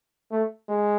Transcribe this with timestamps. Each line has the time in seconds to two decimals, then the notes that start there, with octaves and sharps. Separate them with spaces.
0.31 A3
0.68 G#3